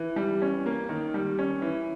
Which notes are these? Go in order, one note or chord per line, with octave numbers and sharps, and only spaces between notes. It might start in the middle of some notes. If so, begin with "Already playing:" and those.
Already playing: E3
G3
C#4
A#3
D#3
G3
C#4
E3